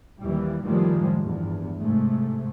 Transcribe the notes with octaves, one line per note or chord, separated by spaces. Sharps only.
D#2 E3 G3
F#2 A2 D#3 F3 G3 G#3
E2 G2
G#2 C3 G#3 A3